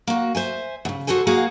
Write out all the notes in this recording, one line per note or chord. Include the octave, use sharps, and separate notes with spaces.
A#3 F#4
C5 E5 G#5
E2 C#3
F#4 G#4 A4 C5 G#5
A#3 F#4 G#4 F5